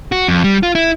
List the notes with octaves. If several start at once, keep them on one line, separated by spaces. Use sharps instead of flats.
F#4
F2
G3
F4
E4